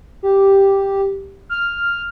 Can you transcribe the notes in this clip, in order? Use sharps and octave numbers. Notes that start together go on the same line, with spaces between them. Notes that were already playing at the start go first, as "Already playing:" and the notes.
G4
F6